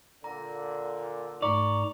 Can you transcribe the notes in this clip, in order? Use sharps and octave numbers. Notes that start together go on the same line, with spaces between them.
A#2 D3 A#5
G#2 A3 D5 A#5 C#6